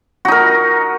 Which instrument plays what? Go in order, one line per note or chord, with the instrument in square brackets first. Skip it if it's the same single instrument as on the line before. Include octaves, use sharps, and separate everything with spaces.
[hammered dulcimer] F#4
D#4
A#4